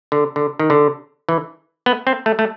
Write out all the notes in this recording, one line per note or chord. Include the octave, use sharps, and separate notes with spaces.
D3
D3
D#3
D3
E3
B3
C4
A3
A3